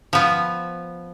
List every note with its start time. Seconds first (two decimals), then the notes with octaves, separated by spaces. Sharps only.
0.13 F3 B3